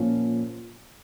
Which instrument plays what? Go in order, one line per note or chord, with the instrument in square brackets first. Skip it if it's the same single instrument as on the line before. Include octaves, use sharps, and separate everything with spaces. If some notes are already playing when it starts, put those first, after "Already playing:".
Already playing: [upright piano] A#2 F3 A#3 C#4